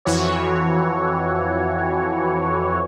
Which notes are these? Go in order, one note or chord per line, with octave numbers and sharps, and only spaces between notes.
F2 E3 F#4 C#5